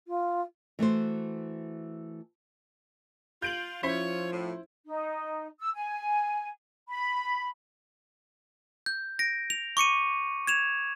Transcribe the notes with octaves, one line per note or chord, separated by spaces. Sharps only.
F4
E3 A3 F#4 C5
F4 G6 D7 F#7
F3 C#4 E4 F4 C5 C#5
A2
D#4
E6
G#5
B5
G6
A#6 D7
F7
C#6 D6 C#7 D#7
G#6 E7 F7